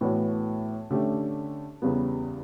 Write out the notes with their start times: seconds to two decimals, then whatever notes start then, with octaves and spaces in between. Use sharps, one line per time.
0.01 A2 E3 B3 F#4 C#5
0.91 D3 A3 C#4 G4
1.82 E2 C#3 G3 B3